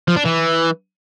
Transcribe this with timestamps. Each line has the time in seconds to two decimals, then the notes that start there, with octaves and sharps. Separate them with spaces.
0.08 F3
0.16 D4
0.25 E3